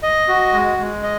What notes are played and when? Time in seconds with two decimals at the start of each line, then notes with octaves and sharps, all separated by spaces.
0.03 D#5
0.28 F#4
0.52 G#3
0.78 G#3
1.03 D#5